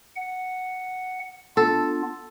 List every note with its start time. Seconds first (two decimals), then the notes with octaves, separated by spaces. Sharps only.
0.16 F#5
1.57 B3 D4 F4 A4